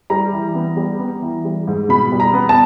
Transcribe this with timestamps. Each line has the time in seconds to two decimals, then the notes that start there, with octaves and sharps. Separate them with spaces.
0.10 G3 A#5
0.33 E3
0.55 B3
0.77 G3
0.99 B3
1.22 E3
1.45 G3
1.68 G#2
1.89 B2 B5
2.12 G3
2.20 A#5
2.34 B3
2.49 A5